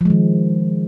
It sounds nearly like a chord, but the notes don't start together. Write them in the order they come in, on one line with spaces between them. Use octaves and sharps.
F3 G#3 D#3